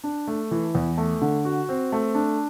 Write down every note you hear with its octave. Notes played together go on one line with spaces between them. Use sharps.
D4
A3
E3
E2
A3
D3
F#4
C4
A3
D4